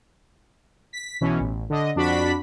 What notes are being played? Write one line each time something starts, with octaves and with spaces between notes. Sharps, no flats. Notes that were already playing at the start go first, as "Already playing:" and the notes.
B6
B1 B2 E3 C#4
A1
D3 D#5
F2 D4 F#4 B5 B6